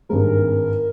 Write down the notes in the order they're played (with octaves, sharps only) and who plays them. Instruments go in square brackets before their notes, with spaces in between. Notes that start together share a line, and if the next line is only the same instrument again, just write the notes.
[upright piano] G#1 G2 D#3 G#3 C4 [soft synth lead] A#4